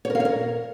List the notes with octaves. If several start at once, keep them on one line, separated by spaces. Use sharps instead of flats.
C#5
A#4
F5
C#5
A#4